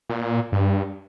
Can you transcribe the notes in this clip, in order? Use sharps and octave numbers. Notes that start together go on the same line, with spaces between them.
A#2
G2